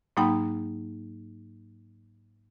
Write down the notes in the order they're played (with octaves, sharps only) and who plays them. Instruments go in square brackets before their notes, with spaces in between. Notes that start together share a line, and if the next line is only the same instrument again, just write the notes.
[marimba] G#2 F#3 A#3 D#4 G5 B5